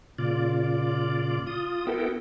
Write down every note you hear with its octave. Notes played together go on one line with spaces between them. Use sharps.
A#2 C#3 F4 D5
F4 D#6
B3 E4 F#4 A4 A#4 G5